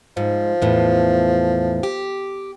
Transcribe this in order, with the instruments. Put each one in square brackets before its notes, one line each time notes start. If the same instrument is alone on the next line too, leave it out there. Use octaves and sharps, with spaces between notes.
[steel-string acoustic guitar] G#2 [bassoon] F3
[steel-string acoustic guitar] E2 A2
G4